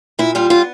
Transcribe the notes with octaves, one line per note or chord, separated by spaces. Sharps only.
A#2 E4
G3 F4
B3 F4